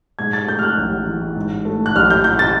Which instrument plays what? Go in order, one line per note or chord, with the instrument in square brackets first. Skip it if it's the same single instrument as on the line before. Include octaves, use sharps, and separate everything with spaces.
[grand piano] G#2 [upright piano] G#6
[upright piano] A6
[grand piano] A3 [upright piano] G6
[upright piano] F6
F#6
[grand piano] A1
E3
G#2
A3
[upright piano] F#6
[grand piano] A1 [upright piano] F6
[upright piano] G6
[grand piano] E3 [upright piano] G6
[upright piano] A6